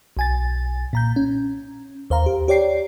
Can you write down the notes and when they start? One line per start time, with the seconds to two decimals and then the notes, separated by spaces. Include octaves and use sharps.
0.17 B1 G#5 A6
0.93 A#2 A#5 G6
1.16 C#4
2.10 D#2 C5 F5 A#5
2.26 G4
2.48 G4 C#5 D5 G5 C7